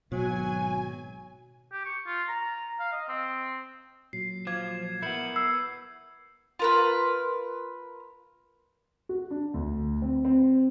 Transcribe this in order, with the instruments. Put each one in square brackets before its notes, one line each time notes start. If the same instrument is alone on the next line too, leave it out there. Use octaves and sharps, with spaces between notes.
[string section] G#1 G#5 [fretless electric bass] B2 [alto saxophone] F#3
[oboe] G4
C#6
F4
A#5
F5
D#5
C4
[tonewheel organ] A#2 F#3 [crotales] C7
[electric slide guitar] F3 [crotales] D6 G#6
[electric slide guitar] B3 E4 [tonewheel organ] A#4 [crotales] G6 C#7 F#7
[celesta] E6 [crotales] C7
[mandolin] F4 A#4 B4
[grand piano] F#4
D4
D2
C4
C4